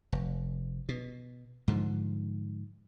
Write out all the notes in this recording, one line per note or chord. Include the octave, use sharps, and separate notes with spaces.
F1
B2
G#2 D3 F3